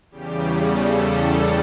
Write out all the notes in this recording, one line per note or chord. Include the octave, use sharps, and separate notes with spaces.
E2 C#3 G3 G4
A4